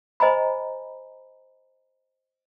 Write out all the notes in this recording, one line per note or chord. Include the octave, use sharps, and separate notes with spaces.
C5 D#5 G#5 A#5 B5